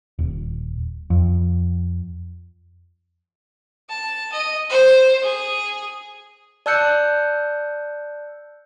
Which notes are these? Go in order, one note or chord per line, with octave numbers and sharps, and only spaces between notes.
D#1
F2
A5
D#5
C5
G#4
D5 A5 E6 F#6 G6 C#7